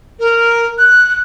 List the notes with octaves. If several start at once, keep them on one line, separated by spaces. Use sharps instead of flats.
A#4
F#6